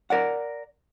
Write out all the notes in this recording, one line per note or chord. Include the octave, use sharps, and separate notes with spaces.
A#4 D5 F#5